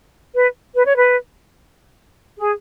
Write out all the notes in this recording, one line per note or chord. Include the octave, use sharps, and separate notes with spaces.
B4
B4
C#5
B4
G#4